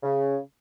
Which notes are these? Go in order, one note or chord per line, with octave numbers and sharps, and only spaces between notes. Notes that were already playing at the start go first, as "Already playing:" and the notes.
C#3